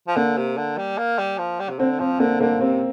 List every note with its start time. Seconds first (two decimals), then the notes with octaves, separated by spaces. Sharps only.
0.07 F3
0.16 D3 A#3
0.37 C3
0.58 D3
0.78 G3
0.98 A#3
1.19 G3
1.39 F3
1.60 G3
1.69 C3
1.79 D3 C4
2.00 F3 C4
2.20 D3 A#3
2.40 D3 A#3
2.61 C3 C4